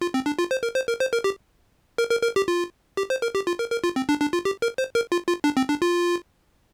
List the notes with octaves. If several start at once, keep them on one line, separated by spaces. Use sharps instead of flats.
F4
C4
D4
F4
C5
A#4
C5
A#4
C5
A#4
G4
A#4
A#4
A#4
G4
F4
G4
C5
A#4
G4
F4
A#4
A#4
F4
C4
D4
D4
F4
G4
A#4
C5
A#4
F4
F4
D4
C4
D4
F4